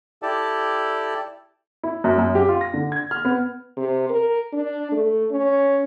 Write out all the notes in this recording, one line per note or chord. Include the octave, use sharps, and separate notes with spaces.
E4 G4 A4 D5 A5
E4
F#2
F#2
G4
F4
A#6
D3
G#6
F6
B3
C3
A#4
D4
A3
C#4